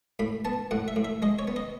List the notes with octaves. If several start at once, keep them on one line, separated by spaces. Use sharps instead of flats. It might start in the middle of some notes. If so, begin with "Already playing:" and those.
A2 B5
B3 A5
A2 F#5
E5
A2
E5
G#3 D#5
C#5
B3
D#5